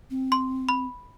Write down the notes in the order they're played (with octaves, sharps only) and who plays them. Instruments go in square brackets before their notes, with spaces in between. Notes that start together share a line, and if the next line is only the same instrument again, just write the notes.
[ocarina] C4
[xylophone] C6
B5